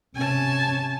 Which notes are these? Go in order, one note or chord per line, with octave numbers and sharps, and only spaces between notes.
C3 C#4 G#5 A5